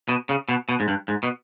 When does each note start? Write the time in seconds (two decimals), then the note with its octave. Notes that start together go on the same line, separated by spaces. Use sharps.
0.08 B2
0.29 C#3
0.49 B2
0.69 B2
0.80 G#2
0.88 G2
1.08 G#2
1.23 B2